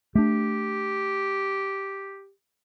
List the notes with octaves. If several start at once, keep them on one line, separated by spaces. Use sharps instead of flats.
A3 D4 G4